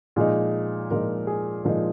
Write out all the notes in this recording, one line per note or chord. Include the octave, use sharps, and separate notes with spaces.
A#2 F3 G#3 D#4 G#4
A#2 F3 G#3 D#4 A#4
G#4
A#2 F3 G#3 D#4 A#4